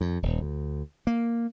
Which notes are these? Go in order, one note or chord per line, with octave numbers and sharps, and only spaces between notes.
F2
D#1
D2
A#3